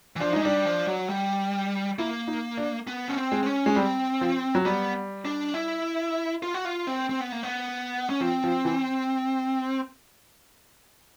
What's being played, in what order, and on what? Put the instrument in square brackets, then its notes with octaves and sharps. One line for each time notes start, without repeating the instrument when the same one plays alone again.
[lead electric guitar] E3
[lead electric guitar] F3 [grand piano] D4
[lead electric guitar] G#3 [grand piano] D#4
[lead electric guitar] G3 [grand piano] D4
[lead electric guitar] F3
F#3
G3
[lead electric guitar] A#3 [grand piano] E4
[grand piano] D#4
D4
[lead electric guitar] B3
C#4
C4
[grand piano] G#3
[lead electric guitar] C4
C#4
[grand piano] G#3 [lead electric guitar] C#4
[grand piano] G3 [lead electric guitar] C4
[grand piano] F3
F#3
[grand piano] G3 [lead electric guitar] B3
[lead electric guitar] D4
E4
F4
F#4
F4
C4
C4
B3
A#3
B3
C#4
[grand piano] F3 [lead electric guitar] C4
[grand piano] F3
E3